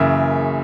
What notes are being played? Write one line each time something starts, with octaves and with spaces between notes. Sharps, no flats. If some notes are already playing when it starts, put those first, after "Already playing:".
Already playing: F#1 F#2 C#3 E3 E5